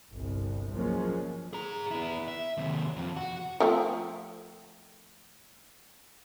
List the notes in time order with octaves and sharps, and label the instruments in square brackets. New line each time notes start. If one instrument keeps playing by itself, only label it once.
[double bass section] G1 C2
F3 F#3 G#3 A#3 C#4
[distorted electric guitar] G#4 A#5
B3 E4
E5
D#2 C3
F2
F#4
[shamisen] F3 A3 C4